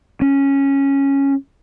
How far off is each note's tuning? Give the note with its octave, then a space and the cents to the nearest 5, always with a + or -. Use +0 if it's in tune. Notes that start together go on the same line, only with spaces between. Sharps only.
C#4 -5